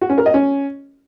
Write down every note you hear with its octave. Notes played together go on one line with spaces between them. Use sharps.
F#4
C#4
A#4
D#5
C#4